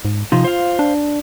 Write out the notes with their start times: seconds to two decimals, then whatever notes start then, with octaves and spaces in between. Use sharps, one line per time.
0.05 G#2
0.32 C3 F3 D#4 F4
0.44 C5 F5
0.79 D4